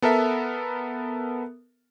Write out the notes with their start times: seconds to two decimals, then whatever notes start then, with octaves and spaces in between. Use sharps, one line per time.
0.02 B3 A4 A#4 E5